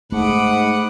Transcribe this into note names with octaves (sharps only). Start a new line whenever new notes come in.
G#2 A3 F#5 B5 D6 D#6